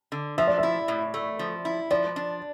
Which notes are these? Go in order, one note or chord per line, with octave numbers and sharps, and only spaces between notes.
D3
F3 E5
D5
E5
E4
A2
A3
F3
E4
F3 D5
D4